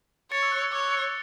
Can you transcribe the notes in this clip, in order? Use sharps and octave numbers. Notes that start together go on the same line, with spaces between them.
C#5 A6 C#7
E6
F#6
E6
C#5 D6